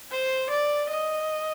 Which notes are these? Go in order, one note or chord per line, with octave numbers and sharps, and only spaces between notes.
C5
D5
D#5